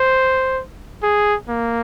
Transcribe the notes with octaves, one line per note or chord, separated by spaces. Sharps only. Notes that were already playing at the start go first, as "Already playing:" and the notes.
Already playing: C5
G#4
A#3